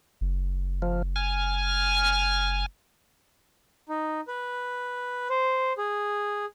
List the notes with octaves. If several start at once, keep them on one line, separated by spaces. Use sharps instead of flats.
F#1
F3
G#5 F6
D#4
B4
C5
G#4